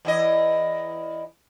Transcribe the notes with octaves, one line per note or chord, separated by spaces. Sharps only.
E2 E4 D#5